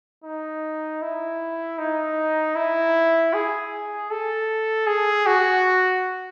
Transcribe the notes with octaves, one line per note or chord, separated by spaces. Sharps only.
D#4
E4
D#4
E4
G#4
A4
G#4
F#4